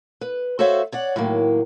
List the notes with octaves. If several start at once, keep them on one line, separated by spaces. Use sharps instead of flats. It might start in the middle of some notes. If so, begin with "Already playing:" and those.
B4
F#4 A4 C5 C#5 E5 F5
C#5 D5 F#5
A2 D#3 F#3 A#3